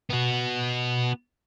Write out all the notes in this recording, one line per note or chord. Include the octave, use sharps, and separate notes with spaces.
B3 F#4